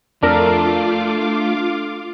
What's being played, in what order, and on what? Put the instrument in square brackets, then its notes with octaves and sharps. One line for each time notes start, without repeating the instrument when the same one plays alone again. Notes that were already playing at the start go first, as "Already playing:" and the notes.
[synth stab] F2 A#4 [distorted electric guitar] A3 [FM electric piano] D4 A4 [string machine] F4 F5 D6